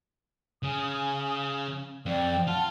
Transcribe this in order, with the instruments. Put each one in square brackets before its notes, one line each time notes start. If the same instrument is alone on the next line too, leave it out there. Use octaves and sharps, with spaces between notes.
[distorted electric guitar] C#3 [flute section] G#5 D#6
[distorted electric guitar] F2 [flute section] D5 G5
[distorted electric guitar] F4 [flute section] F#5 A5